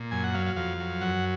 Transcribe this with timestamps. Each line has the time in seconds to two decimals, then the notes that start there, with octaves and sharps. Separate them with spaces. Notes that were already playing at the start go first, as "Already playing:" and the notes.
Already playing: A#2
0.11 F#2 G#5
0.24 F#5
0.34 F#3 F5
0.46 F5
0.56 F2 F5
0.80 F#3
1.01 F#2 F#5